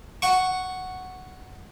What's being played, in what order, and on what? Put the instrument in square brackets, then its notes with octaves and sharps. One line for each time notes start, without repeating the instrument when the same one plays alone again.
[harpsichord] F#5 C#6